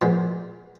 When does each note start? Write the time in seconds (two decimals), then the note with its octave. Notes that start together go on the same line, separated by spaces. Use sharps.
0.02 A#2 F3 G#3 B3